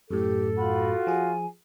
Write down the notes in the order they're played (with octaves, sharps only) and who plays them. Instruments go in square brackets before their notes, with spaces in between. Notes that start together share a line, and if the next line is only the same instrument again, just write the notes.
[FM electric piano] F#2 A2 [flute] G4 [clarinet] A4
[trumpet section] F4 F#4 [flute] B5
[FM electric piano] F3 G#4 [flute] G#5